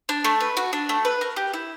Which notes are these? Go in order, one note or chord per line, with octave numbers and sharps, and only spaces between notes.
D4
A3
B4
F#4
D4
A3
B4
A#4
G4
E4